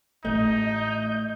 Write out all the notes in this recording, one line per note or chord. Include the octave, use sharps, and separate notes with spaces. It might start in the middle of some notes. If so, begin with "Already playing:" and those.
A1 G#3 A3 D#4 D#5 G6